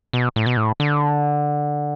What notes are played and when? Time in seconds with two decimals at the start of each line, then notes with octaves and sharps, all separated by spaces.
0.13 B2
0.36 A2
0.46 B2
0.57 A2
0.80 D3